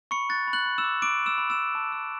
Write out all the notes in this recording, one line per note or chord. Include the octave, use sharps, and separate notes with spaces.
B5 C#6 C#7
F#6 A6
B5
F#6 F#7
B5
E6 E7
D6
B5 D6 D7
B5
E6 E7
B5
E6 E7
B5
A5
E6